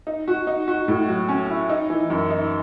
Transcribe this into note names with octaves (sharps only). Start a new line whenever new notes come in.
D#4
F#4
D#4
F#4
A2
F#3
C#4
E4
D#4
E3
F#2
D#4